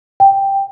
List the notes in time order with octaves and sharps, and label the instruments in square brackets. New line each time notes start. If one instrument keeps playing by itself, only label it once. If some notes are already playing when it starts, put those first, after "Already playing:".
[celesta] G5